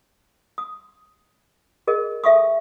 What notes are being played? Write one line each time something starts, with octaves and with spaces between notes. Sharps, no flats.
D#6
G#4 A#4 D#5
A4 E5 F5 C#6 D#6